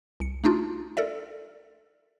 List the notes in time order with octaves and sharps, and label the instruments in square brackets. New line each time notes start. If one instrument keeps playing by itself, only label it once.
[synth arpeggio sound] C2 C#7
A3 D4 D#4 F4 F#4
A4 A#4 D5 E5